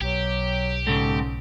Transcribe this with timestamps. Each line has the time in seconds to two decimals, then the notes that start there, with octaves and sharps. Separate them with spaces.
0.01 B1 F#3 G4
0.87 G#2 C#3 A4